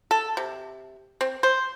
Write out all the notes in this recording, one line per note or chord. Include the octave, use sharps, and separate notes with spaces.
A4
C3
C4
C5